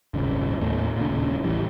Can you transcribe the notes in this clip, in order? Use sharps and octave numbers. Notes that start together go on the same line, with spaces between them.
D#1 G#1 C#3
D#2 A2 A3
A#2 D3
D#1 C#3
A1 E3 G3